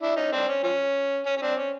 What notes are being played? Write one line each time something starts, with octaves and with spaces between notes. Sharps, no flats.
D4 E4
C#4 D#4
C4 D4
C#4
F3 C#4
C#4
C#4
C4 D4
C#4